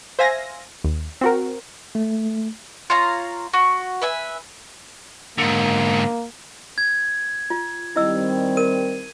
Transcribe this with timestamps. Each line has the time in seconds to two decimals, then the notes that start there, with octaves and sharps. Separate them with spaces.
0.19 C5 E5 F5 G#5 A#6
0.84 D#2
1.21 C4 F#4 A#4
1.95 A3
2.90 F4 C#5 F5 A#5
3.53 F#4
4.02 B4 E5 G#5
5.38 G#2 D3 A#3
6.78 G#6
7.50 F4
7.96 D#3 G3 C4 E4 D#5 E6
8.57 A#4 D#7